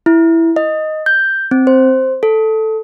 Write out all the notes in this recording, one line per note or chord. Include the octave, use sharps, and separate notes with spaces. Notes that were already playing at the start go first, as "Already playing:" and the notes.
E4
D#5
G6
C4
C5
A4